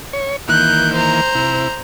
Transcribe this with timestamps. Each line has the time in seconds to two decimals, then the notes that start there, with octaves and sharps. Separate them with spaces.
0.13 C#5
0.49 D#3 E3 A#3 F#6 G6
0.94 C5 A#5
1.35 C3 E4